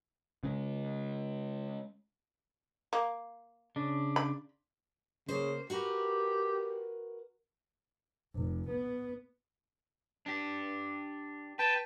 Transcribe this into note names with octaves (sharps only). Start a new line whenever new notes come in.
C#3 G#3
A#3
C#3 D4
B5
C#3 A#3 C5
F#4 G4 A#4 B4
F1
B3
D4 G4
B4 G5 A5